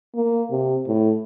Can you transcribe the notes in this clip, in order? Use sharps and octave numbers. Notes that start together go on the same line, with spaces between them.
A#3
C3
A2